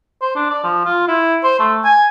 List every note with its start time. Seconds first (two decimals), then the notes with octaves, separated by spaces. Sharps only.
0.22 C5
0.36 D4
0.50 D5
0.64 F3
0.85 F4
1.08 E4
1.44 C5
1.60 A3
1.85 G#5